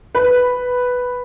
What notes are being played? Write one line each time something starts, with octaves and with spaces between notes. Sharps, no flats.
B4